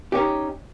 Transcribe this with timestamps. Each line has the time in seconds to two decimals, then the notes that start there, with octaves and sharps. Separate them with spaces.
0.12 G4
0.15 C#4
0.18 D#4